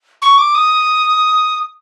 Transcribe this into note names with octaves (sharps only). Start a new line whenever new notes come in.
C#6
D6
D#6